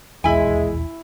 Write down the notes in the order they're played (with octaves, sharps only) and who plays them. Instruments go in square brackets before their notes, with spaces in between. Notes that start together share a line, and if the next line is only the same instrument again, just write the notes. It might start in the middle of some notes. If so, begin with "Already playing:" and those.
[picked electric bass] D#1 B1 E2 [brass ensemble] G#3 [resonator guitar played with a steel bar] E4 G#5